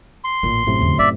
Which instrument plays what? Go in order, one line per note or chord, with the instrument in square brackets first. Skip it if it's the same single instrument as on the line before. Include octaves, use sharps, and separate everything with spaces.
[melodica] C6
[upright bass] A1 [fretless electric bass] A#2
[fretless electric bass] F#2 A2 C3
[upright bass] E2 D3
[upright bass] B3 [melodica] D5 E5